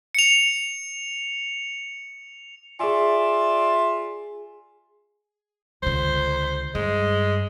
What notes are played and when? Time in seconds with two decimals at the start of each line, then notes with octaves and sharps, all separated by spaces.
0.15 C#7 F7
2.79 F4 G#4 D5 E5 G#5
5.83 C#2 D3 C5
6.75 G2 G#3